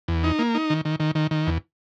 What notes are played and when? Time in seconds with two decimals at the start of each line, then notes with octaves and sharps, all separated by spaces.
0.08 E2
0.24 D#4
0.39 A#3
0.55 D#4
0.70 D#3
0.85 D#3
1.00 D#3
1.15 D#3
1.31 D#3
1.47 E2